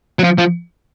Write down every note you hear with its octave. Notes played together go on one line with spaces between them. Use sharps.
F#3
F3
F3